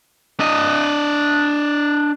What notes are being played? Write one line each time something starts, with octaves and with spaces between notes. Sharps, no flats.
D4 D#5